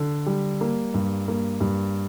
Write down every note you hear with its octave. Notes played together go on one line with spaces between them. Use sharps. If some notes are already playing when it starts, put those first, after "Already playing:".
Already playing: D3
G3
A#3
G2
A#3
G2